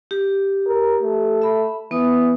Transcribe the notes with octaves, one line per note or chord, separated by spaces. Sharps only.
G4
A#4
A3
E5 B5
E3 B3 D#6